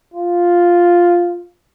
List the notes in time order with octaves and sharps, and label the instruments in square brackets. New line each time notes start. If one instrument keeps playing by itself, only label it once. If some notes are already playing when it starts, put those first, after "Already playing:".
[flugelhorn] F4